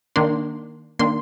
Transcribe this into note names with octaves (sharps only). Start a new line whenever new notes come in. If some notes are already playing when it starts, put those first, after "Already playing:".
D#3 A#3 D4 C6
D#3 A#3 D4 C6